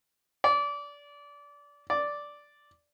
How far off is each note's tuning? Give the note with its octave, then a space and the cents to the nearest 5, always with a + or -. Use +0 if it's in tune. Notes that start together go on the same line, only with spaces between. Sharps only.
D5 -25
D5 -5